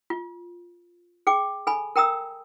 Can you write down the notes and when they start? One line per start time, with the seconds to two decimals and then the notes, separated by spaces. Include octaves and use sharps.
0.10 F4
1.27 G#4 G5 D6
1.67 A4 G#5 B5
1.96 A#4 G5 A#5 D#6 E6